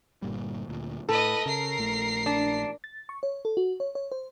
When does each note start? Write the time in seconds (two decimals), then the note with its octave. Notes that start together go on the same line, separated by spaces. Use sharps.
0.22 G1 A#2 G3
0.68 D2 A#2
1.09 A2 A4 B4 D#5
1.46 C#3 A#4 C7
1.78 A#1 A3
2.26 D4
2.84 A6
3.09 C#6
3.23 C#5
3.45 A4
3.57 F#4
3.80 C#5
3.95 C#5
4.12 C5